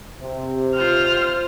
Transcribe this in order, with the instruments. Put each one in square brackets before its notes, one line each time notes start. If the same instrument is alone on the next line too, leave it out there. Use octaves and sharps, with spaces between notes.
[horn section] C3
[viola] F4 C5 [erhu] F6